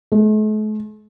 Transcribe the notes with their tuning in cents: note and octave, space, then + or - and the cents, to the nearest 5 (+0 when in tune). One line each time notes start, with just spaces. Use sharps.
A3 -45